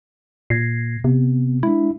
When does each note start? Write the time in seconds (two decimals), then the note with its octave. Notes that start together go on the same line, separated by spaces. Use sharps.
0.50 A#2 G#6 A#6 C7
1.04 C3 B3
1.63 G#3 D4 E4